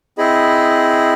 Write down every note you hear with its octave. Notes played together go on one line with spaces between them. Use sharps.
C4 E4 G#4 D#5 B5